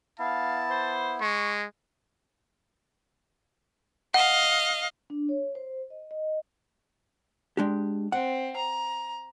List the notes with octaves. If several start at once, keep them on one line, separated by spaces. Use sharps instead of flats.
B3 E4 F5 A5
C5
G#3 C#6
D#5 F5 F#5
D4
C#5
C5
D#5
D#5
G#3 D4 G4
C4 F#5
A#5